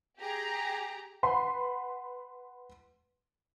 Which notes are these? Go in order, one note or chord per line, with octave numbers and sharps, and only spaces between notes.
G4 G#4 A#5
B4 F#5 B5 C6